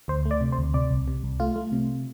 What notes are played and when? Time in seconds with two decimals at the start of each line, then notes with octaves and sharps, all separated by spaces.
0.08 D2 C5
0.26 A3
0.31 D5
0.41 C3
0.52 C5
0.58 D2
0.74 C3 D5
0.91 C2
1.08 C3
1.24 C2
1.40 A3 F4
1.56 A3
1.72 C3